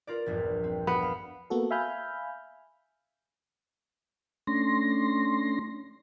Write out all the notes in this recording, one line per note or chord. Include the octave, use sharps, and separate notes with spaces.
F4 A#4 D5
A#1 E2 G2
C4
B3
F5
A#3 B3 F#4 A4
E5 F5 G#5 B5 F6 G6
A3 C#4 D4 C6 A#6